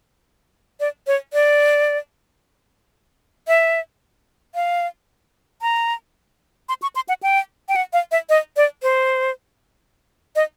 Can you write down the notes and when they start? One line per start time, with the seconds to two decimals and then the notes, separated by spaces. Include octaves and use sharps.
0.80 D5
1.07 C#5
1.33 D5
3.48 E5
4.55 F5
5.62 A#5
6.69 C6
6.82 C#6
6.96 C6
7.09 F#5
7.23 G5
7.69 G5
7.76 F#5
7.93 F5
8.12 E5
8.29 D#5
8.57 D5
8.83 C5
10.36 D#5